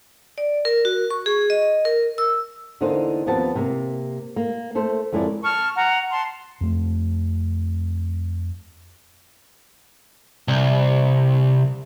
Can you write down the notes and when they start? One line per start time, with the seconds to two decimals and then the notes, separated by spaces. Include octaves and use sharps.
0.38 D5
0.65 A#4
0.85 F#4
1.11 C#6
1.26 G#4
1.50 D#5
1.85 A#4
2.18 E6
2.81 E2 D3 A#3 D#4 C5 F5
3.27 D#2 F3 B3 C4 A5
3.55 C3 A#3
4.36 A#3
4.75 A3 A4 C5
5.12 F2 G#3 E4 A#4 C#5 D5
5.43 A5 C#6 F6
5.75 F#5 A#5
6.11 A5 C6
6.61 F2 A3
10.48 C2